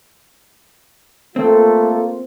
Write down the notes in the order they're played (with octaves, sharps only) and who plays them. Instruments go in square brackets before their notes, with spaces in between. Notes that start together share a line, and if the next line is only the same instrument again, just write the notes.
[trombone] A3 [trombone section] A#3 F4 [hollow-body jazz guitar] C4 [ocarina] A4